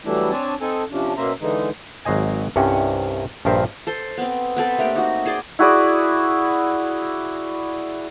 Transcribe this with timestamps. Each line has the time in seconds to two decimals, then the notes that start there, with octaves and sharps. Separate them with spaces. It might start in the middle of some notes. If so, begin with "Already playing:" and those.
0.05 E3 F#3 G3 A3 D4 E4
0.31 C4 D4 C#5 G#5 A5
0.61 C4 D#4 A4 G#5
0.92 C3 F3 C#4 D4
1.17 B2 A#3 C#4 C5 E5 A#5
1.41 D3 E3 G#3 D#4
2.05 G#1 F#3 C5 D#5 G#5
2.56 C2 G2 C3 C#4 F#5
3.45 A#1 G2 F3 A#4 C5 E5
3.87 A4 C5
4.17 B3 C4
4.56 B3 C4 A4 B4
4.78 A3 A#3 D4 G4
4.95 D#4 F#4
5.26 G#4 C5 D5
5.59 E4 F#4 G#4 D5